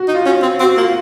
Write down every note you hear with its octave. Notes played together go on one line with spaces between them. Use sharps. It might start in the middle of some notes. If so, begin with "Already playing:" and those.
Already playing: F#4
D#4
F4
C#4 F#4
C4
C4 F#4
A#3 F4